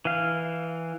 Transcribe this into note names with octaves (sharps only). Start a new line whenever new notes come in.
E3 F5